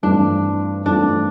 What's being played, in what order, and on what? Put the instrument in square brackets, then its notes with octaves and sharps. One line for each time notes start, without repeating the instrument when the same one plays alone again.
[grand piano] G2 E3 A3 C4 F4 [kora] D4
[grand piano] G2 E3 A3 C4 F4 [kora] D4